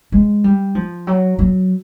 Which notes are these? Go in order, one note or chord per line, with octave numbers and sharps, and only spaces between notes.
G#3
G3
F3
F#3
F#3